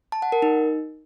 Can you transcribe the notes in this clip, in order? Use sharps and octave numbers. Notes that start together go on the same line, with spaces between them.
A5
F#5
A#4
D#4